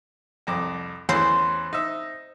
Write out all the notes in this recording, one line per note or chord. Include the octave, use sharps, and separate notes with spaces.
C2 F2 D6
E2 E3 C#4 C5
D#4 E5